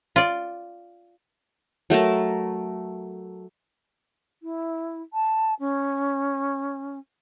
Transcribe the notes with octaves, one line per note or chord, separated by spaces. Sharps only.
F4 D5
F#3 A3 A#4 A5
E4
A5
C#4